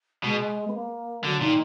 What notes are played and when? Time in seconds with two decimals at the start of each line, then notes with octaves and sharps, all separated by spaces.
0.24 B2 G#3
0.67 B3
0.74 A#3
1.24 D3 F#3
1.40 A#2 D#3